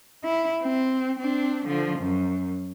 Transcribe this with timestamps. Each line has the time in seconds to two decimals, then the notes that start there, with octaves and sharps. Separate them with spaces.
0.24 E4
0.62 C4
1.19 C4 D4
1.66 D3 F3
1.99 F#2